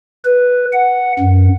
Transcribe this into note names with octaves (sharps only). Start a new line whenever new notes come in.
B4
F#5
F#2